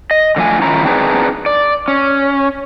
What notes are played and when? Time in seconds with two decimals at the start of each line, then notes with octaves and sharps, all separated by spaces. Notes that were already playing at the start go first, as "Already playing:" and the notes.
0.11 D#5
0.36 D3 F3 A3 G#5
0.62 D#3 C#4 E4 F4 A#5
0.85 C4 D4 D#4 G#4 A#4 B4
1.46 D5
1.88 C#4